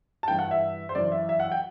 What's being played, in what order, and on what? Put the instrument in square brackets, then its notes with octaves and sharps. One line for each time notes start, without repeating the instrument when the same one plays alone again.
[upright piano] A5
G2 E3 G5
F#5
E5
C5
F#2 E3 D5
E5
E5
F#5
G5